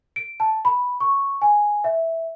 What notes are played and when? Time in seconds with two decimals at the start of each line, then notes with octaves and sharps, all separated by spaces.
0.16 D7
0.40 A5
0.65 B5
1.00 C#6
1.42 G#5
1.84 E5